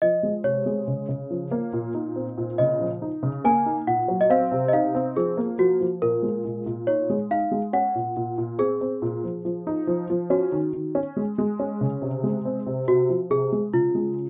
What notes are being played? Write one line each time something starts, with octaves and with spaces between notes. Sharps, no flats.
F3 D#5
G#3
C3 C#5
G#3
C#3
C#3
F3
A#3
A#2
D#4
C4
A#2
C#3 D#5
F3
D#4
C#3
A#3 G#5
D#4
A#2 F#5
F#3
D#5
C4 F5
C3
D#5
D#4 F5
C4
F3 G#4
A#3
F3 F#4
F3
A#2 A#4
G#3
A#2
A#2
D#4 C#5
G#3
D#4 F5
G#3
C#4 F#5
A#2
A#2
A#2
C4 G#4
C4
A#2
F3
F3
D#4
F3
F3
C#4 F#4
D#3
D#3
C#4
G#3
G#3
C#4
C#3
C3
G#3
C4
C3
C3 F#4
F3
C3 G#4
G#3
C#3 F4
G#3